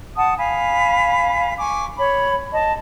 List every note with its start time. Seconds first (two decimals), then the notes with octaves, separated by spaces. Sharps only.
0.16 F#5 A5 D#6
0.37 F5 G#5 B5
1.58 G#5 C#6 D6
1.98 C#5 B5
2.52 D#5 A5